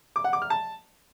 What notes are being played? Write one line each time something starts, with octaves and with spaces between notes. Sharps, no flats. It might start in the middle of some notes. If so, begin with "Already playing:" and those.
D6
F#5
D6
F6
A5